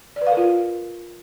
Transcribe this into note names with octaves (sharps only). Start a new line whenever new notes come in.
D5
B4
F5
A#4
F4